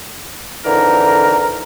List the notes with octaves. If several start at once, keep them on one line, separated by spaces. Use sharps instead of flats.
F2 D3 E3 D#4 A#4